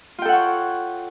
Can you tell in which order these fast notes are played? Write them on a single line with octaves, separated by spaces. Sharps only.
F4 G5 A4 F#5 C#5